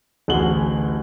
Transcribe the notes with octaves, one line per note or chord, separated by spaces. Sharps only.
A1 D2 F#4 G#4 F#7 G7